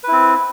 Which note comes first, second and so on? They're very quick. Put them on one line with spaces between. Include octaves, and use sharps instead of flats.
B4 E4 C4